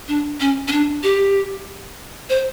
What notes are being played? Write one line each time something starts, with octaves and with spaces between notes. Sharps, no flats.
D4
C#4
C#4
D4
G4
C5